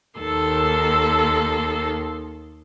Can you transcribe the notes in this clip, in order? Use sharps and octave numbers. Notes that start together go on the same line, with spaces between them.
D#2 D#3 A4 C6